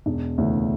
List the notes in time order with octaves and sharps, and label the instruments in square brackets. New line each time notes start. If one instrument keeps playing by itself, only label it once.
[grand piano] E1
D2 C#3 E3 A3